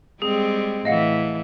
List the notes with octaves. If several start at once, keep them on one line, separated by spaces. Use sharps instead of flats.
G3 G#3 C4 G#4
A2 E3 D#5 F5 F#5